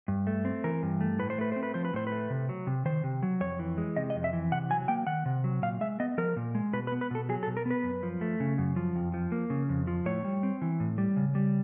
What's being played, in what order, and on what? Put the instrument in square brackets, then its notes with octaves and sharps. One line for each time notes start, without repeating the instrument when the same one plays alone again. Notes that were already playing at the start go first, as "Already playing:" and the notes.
[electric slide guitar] G2
A3
C4
E3 A#4
G2
A3
A2 B4
C5
A3 B4
C4 C5
B4
F3 C5
B4
A2 C5
B4
A3
C3
F#3
C3
D#3 C5
C3
F#3
F2 C#5
E3
G#3
C3 D#5
D#5
F2
E5
E3
C3 F#5
F#3 G#5
A#3 G5
D#3 F#5
C3
F#3
A#2 F5
G#3 E5
B3 D#5
F3 A#4
A#2
G#3
B2 B4
B4
B3
B4
B2 A4
F#3 G#4
A4
B2
A#4
B3 B4
F#2
F3
A3
C#3
F#2
F3
F2
F3
A#3
C#3
F2
F3
A2 C#5
G3
C4
E3
A2
G3
C#3
G3